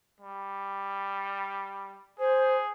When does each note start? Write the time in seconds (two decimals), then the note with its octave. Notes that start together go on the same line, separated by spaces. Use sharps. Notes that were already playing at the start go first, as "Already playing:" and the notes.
0.20 G3
2.19 G#4 C5